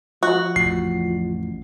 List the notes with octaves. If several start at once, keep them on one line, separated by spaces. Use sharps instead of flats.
F3 F#4
A1 F2 C7